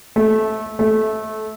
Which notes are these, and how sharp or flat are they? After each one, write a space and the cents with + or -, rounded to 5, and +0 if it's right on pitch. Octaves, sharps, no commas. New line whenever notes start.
A3 -20
A3 -20